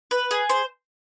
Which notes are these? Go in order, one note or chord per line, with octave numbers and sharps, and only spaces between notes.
B4
G#4
C5